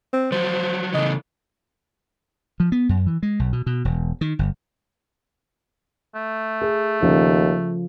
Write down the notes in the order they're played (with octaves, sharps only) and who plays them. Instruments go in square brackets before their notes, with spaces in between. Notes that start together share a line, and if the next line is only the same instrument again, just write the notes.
[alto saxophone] C4
[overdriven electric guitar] F3 F#3 [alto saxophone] C5
[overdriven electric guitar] C#3 E3 [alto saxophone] D#5
[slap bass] F3
B3
F#2
E3
G#3
B1
B2
B2
E1
D#3
G1
[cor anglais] A3
[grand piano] G#4
[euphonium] D#2 [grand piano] C#3 F3 A4